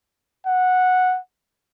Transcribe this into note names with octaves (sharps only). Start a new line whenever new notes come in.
F#5